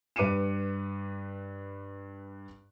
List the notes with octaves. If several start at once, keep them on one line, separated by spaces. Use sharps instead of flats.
G2 B4 D6 C#7 D#7 E7